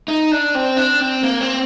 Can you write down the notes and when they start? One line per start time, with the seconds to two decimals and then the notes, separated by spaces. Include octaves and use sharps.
0.08 D#4
0.32 D4
0.55 C4
0.77 D4
1.00 C4
1.23 A#3
1.41 C4